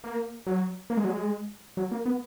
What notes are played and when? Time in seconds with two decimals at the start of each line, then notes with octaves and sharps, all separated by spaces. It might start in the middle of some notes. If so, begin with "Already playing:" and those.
0.04 A#3
0.46 F#3
0.90 A#3
0.97 G#3
1.04 F#3
1.11 G#3
1.77 F#3
1.92 A#3
2.06 B3